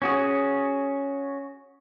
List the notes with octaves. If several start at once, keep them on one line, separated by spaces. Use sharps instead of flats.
C#4 F#4 G#4